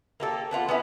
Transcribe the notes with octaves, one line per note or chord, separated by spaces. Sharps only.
A#3 G4 A4
B3 D4 F4 F#5
B3 C#4 E4